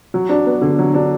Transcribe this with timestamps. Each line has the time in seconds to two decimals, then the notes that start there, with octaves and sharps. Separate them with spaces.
0.14 F#3
0.29 D4
0.46 B3
0.62 D3
0.79 F#3
0.94 D4